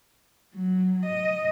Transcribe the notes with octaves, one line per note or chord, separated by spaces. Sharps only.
F#3
D#5